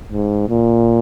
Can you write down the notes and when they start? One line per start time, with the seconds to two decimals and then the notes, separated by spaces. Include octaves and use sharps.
0.12 G#2
0.49 A#2